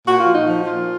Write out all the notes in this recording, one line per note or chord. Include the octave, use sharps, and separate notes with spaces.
A#2 F#4
F4
F3
D#4
F3
A#2 F4